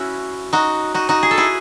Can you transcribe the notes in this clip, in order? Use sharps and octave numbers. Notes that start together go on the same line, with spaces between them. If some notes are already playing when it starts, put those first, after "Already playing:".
Already playing: C#4 E4 F#4
D#4 F#4
D#4 F#4
D#4 F#4
G#4
A4
E4 G#4